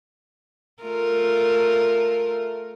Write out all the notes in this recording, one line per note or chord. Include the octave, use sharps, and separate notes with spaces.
A3 F4 A#4